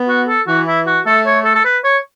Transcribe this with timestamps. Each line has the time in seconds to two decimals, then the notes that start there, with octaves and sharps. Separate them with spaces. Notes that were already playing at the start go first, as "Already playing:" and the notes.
Already playing: B3
0.08 F#4
0.28 A4
0.47 E3 F#4
0.67 E4
0.86 F#4
1.06 A3 A4
1.26 C#5
1.45 A4
1.55 A4
1.64 B4
1.84 C#5